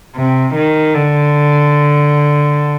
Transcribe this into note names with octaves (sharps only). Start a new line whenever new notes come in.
C3
D#3
D3